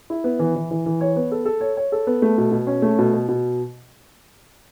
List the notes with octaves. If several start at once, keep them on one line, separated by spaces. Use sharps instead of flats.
E4
B3
E3
E3
E3
E3
C#5
B3
A4
A4
C#5
C#5
A4
B3
A3
B2
B2
C#4
A3
B2
B2
B2